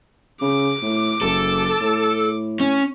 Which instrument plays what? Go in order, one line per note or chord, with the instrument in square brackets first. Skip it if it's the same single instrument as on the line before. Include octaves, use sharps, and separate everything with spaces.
[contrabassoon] C#3 [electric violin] D6
[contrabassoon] A2
[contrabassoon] F#1 [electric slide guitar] A4
[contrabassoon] A2
[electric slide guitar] C#4